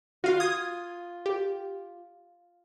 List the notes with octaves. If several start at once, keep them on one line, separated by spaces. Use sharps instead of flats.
F4 F#4 F5
D#6 G#6
G4